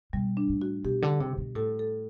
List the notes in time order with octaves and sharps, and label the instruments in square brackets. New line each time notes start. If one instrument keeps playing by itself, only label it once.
[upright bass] B2 [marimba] G3
[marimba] D4
[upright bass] A2
[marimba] F#4
[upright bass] B2 [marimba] G4
[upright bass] D3
C3
B2
[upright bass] A2 [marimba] A4
[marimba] A4